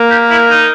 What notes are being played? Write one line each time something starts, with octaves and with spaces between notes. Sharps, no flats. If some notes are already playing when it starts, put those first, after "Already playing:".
Already playing: A#3
G4
E4
D#4